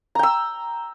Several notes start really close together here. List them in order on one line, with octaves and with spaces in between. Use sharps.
A#5 G5 E6